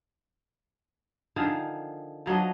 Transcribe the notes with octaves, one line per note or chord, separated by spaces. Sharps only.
D3 D#3 F3 G#4
F3 F#3 D4 D#5